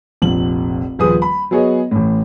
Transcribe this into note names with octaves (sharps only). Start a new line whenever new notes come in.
F1 A#1 F#7
D#1 F3 G#4 B4 D#6
B5
F#3 B3 G#4 C#5 D#5
A1 A2